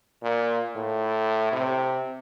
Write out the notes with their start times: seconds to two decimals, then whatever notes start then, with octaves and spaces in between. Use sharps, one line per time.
0.22 A#2
0.75 A2
1.52 C3